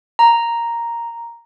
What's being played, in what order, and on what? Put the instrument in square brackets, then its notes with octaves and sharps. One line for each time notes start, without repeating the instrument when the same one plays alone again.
[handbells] A#5